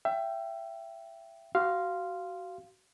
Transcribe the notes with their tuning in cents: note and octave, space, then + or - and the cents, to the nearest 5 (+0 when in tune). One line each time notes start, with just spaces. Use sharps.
E5 +25 G5 -5
F#4 +25 F5 -10 C6 +0